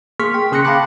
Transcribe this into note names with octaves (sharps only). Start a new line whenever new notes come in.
A#3 G#4 C6 C#6 F6 B6
G5
C#3 C6 F#6 A#6 C#7
F5 G5 A5 B5 D6 F#6